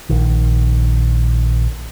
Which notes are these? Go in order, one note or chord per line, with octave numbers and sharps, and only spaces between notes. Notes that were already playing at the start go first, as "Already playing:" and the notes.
A#1 D#3